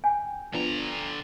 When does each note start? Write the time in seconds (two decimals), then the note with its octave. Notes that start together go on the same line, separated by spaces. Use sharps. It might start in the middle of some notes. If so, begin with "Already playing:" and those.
0.04 G5 G#5
0.53 D3 F3 B3 D4 A#5